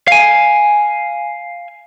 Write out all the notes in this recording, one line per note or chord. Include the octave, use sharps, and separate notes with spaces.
F5 G#5